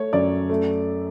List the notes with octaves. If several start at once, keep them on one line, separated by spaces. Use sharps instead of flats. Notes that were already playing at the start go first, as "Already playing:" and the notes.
Already playing: A3 C#5
F#2 D5
A3